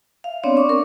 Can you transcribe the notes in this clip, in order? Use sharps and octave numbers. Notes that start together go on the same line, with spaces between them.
E5 F5
B3 C4 D4 C#5 D5
C4 C#6 D6
A#4